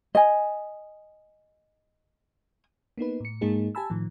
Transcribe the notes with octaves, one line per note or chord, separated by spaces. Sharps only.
D#5 G#5
A#3 B3 D#4 B4
A2 C#7
G#2 G#3 A#3 D#4 G#4
G4 G#5 A5 B5 E6
A2 D#3 F3